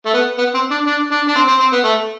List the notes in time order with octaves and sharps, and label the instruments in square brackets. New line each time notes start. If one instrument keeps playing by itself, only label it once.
[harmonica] A3
B3
B3
C4
D4
D4
D4
D4
C4
C4
C4
B3
A3